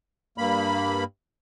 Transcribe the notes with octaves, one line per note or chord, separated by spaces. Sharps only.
G2 A#3 B5